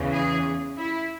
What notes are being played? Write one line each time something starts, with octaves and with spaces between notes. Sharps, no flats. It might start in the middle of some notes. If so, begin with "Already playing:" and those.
Already playing: E2 C#3 E3
G#4
E4